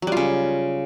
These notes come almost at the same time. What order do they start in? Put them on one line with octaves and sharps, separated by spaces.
F#3 G3 F4 C#3